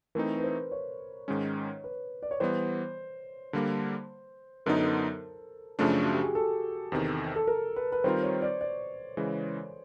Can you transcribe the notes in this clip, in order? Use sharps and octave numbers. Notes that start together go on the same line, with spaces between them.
E3 A3 C4 D#4 A#4
B4
C5
C#5
G#2 D#3 G#3 C#4
B4
D5
C#5
E3 G3 B3 C5
D3 G3 A#3
F#2 D3 F#3 B3 D#4 A#4
A4
A#4
F#2 C#3 F3 A3 D4
F#4
G4
G#4
A4
E2 C3 D#3
A4
A#4
B4
B4
D#3 G3 C4 F4 A#4 C5
C#5
D5
D5
C#3 E3 G#3